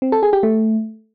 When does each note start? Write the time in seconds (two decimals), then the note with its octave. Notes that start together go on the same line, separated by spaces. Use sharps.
0.02 C4
0.12 A4
0.23 G#4
0.33 G4
0.43 A3